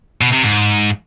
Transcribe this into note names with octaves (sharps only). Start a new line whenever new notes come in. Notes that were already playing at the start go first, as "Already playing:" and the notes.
B2
C3
G#2